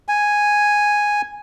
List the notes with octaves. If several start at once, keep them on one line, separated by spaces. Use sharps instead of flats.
G#5